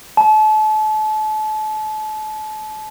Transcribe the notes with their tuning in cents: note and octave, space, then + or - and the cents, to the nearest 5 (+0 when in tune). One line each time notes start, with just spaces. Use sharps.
A5 -35